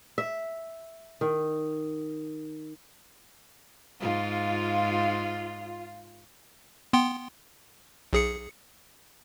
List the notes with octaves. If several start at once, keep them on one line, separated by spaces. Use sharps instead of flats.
E5
D#3
G#2 F4
B3 G5 C6
B1 G#4 C#7